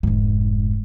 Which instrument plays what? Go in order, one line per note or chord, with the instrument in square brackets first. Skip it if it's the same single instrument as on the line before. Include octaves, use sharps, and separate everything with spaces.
[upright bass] F1 G#2